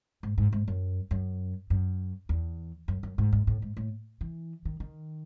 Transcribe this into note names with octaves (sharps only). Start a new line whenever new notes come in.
G#2
G#2
G#2
F#2
F#2
F#2
E2
F#2
F#2
G#2
G#2
A2
G#2
A2
E3
D#3
D#3